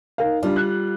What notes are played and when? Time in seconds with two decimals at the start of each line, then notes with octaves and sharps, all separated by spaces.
0.18 D#4 A#4 F5
0.43 G3 D4 F4
0.56 F#6